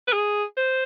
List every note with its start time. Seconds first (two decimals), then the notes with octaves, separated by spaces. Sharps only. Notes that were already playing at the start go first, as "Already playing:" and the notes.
0.08 B4
0.13 G#4
0.57 C5